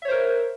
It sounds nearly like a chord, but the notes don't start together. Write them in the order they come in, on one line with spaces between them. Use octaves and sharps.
E5 C#5 C5 A#4